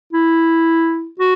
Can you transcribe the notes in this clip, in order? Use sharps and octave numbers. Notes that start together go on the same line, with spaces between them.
E4
F#4